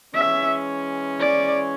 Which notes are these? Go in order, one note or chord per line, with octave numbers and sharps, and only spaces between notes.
E3 G#3 C#4 E5
D5